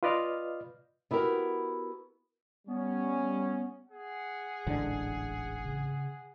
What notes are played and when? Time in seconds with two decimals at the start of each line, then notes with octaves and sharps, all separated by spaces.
0.03 F4 B4 D5 D#5 F5 F6
1.11 B3 E4 F#4 G4 A#4
2.68 G3 B3 C#4
3.90 G#4 F#5
4.66 E1 A1 G#2 D3
5.65 C#3